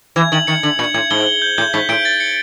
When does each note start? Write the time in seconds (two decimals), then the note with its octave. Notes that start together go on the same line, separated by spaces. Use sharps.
0.16 E3 G#6
0.32 D#3 F#7
0.47 D#3 C#7
0.63 D3 F#7
0.79 A#2 G#6
0.94 A2 G#6
1.10 G#2 G7
1.27 G7
1.42 G6
1.58 A2 G6
1.73 G#2 B6
1.89 A2 D7
2.05 A6
2.20 C#7